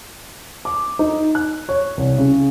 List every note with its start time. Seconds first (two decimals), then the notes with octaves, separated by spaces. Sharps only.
0.65 D6
0.99 D#4
1.35 F#6
1.69 C#5
1.97 C2
2.18 C#3